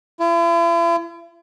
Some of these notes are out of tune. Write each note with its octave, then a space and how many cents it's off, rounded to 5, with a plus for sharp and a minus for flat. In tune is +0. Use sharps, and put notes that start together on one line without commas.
E4 +45